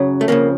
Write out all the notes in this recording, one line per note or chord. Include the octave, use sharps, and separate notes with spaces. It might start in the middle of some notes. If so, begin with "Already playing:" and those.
Already playing: F#2 C#3 F#3
A3
F2 C#3 F3 A#3